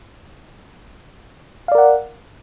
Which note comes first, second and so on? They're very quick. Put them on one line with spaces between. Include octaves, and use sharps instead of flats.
F5 D5 A#4 F#5